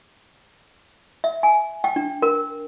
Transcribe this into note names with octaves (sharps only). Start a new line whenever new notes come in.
E5
G#5
G5
D4
A#4